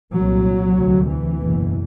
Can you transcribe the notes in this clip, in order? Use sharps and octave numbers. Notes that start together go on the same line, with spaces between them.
C2 A#2 F#3
D2 C3
E3
F#1 E2 B2